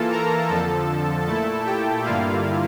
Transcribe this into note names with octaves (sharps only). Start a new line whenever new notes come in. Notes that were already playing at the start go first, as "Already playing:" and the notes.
Already playing: E3 A#3 F4 A4 A5
A#4 A#5
F2 D3 F3 A4 A5
A#2 A3 E4 A4 A5
G4 G5
G2 D3 G3 A#3 E4 F4 F5